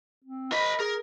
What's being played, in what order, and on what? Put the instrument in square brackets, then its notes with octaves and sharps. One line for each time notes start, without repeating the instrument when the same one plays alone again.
[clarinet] C4
[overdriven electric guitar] A#4 B5 [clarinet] D#5
[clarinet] G#4 [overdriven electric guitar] A#4